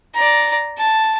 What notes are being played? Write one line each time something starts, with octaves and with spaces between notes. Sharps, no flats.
D5 A#5
A5